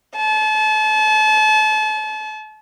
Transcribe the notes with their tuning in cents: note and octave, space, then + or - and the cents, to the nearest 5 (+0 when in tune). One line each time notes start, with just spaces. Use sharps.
A5 -35